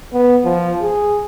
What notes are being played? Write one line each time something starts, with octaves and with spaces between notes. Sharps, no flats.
B3
F3
G#4